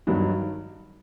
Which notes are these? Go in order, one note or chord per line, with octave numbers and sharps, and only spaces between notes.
G2 D#3 F#3